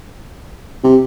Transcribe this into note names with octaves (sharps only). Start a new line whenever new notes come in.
C3